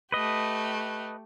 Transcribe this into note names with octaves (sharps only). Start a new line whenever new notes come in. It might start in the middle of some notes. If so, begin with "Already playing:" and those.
A3 G4 B4 D#5